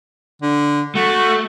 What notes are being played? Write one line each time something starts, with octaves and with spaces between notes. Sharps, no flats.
D3
A3 F#4